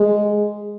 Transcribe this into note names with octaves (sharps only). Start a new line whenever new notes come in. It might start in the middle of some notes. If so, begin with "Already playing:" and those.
Already playing: G#3